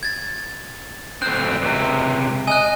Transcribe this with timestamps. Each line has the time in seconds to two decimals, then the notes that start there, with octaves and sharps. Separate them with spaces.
0.03 G#6 A6
1.22 D2 C4 F#6
1.62 C#2 C3
2.48 D#5 G#5 F#6